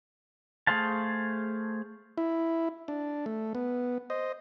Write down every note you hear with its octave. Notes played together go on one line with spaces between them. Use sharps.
A3 G#4 C5 F5 A5
E4
D4
A3
B3
C5 D#5